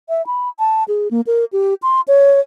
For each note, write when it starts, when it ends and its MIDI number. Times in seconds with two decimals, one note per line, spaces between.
0.09 0.25 76
0.27 0.49 83
0.59 0.84 81
0.88 1.08 68
1.11 1.21 58
1.27 1.45 70
1.53 1.74 67
1.82 2.01 84
2.08 2.40 73